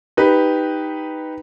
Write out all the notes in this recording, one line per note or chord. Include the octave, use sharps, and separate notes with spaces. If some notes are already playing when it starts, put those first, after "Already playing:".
D#4 G4 B4